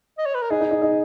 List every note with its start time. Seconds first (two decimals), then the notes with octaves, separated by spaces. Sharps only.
0.18 D#5
0.26 C#5
0.34 B4
0.42 A#4
0.50 D#4 G#4
0.61 D#4
0.71 D#4
0.82 D#4